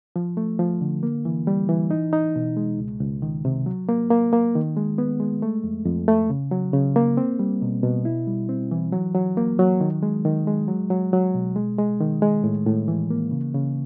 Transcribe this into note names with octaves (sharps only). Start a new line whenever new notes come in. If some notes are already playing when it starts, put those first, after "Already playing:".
F3
A3
F3
D3
A#3
E3
G3
E3
D#4
D#4
B2
G#3
C#2
C#2
D#3
C3
F#3
A#3
A#3
A#3
D#3
G#3
B3
G#3
A3
F2
F2
A3
C#3
F#3
C#3
A#3
C4
G3
B2
B2
E4
G3
C4
E3
F#3
F#3
A#3
F#3
D#3
G#3
D#3
G#3
F#3
F#3
F#3
B2
G#3
G#3
D#3
G#3
A2
A2
E3
A#3
C#3
C#3